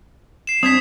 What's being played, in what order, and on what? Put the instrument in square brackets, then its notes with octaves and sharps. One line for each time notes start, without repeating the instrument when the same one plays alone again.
[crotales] C7 E7
[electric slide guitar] G2 C4 D4 [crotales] D#6 G#6 B6